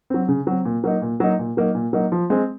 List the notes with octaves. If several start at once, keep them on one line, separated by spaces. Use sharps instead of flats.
F#3 C4
C#3
F#3 C4
A#2
F#3 A#3 D#4
A#2
F#3 A#3 D#4
A#2
F#3 A#3 D#4
A#2
F#3 A#3 D#4
F3
G#3 C4